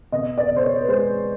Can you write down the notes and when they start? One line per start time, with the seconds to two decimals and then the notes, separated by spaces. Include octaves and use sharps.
0.12 B2 D#5
0.38 D5
0.51 B2
0.56 C5
0.63 C#5
0.81 B4
0.88 G#3 C5